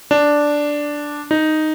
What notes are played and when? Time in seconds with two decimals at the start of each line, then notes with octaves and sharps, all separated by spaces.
0.11 D4
1.31 D#4